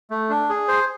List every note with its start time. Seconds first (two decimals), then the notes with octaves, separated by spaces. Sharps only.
0.10 A3
0.29 D4
0.49 G#4
0.68 C5